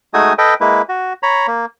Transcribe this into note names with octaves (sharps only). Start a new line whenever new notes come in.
G#3 A3 D#4 F#4 G#5 D#6
A4 B4 D#5 G5
G#3 A#3 E4 B4
F#4
C#5 A#5 B5
A#3